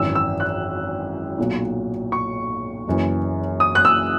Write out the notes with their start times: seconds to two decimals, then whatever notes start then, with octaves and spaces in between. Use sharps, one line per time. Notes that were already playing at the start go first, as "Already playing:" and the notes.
Already playing: G#1 F#2 E3 E6
0.15 E6
0.40 F#6
1.38 B1 A#2 F#3
2.12 C#6
2.87 F#1 F#2 E3
3.60 D#6
3.75 F#6
3.85 E6